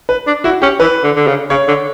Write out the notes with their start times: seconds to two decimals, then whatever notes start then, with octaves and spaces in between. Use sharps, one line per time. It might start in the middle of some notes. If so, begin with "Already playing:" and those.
0.09 B4
0.27 D4
0.44 E4 F#4
0.62 C#4 G4
0.80 E3 B4
1.03 D3
1.16 D3
1.27 C#3
1.50 C#3 C#5
1.68 D3